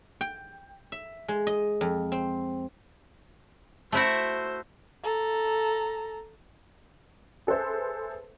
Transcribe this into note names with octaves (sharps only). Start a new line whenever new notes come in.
G5
E5
G#3
D#5
F2
C4
A3 E4 F#4 C5
A4 A#5
G#4 A4 B4 C5 E5